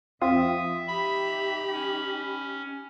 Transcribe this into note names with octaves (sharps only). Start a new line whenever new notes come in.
F2 C4 F4 E5 F5 D#6
D#4 G4 B5
C#4